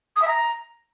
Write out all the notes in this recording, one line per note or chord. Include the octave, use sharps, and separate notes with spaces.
D#6
E5
A#5